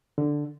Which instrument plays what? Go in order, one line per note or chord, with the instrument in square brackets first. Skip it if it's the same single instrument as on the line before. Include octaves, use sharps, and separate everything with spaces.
[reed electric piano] D3